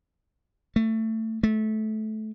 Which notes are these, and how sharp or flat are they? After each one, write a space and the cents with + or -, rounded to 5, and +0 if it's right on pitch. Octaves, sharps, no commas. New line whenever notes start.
A3 +20
A3 -20